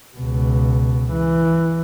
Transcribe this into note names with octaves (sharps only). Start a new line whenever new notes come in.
C#2 B2
E3